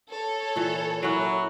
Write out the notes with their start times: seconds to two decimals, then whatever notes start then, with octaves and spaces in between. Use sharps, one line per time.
0.12 A4 C#5
0.56 A#2 E3
1.03 F#3 C#4 E4 F#4